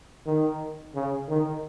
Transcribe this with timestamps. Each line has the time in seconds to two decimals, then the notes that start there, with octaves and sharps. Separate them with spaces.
0.27 D#3
0.95 C#3
1.29 D#3